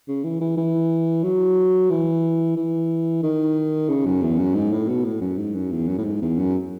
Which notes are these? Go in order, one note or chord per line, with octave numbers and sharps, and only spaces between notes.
C#3
E3
E3
E3
F#3
E3
E3
D#3
C#3
F#2
E2
F#2
G#2
A2
B2
A2
F#2
G#2
F#2
E2
F#2
A2
G#2
E2
F#2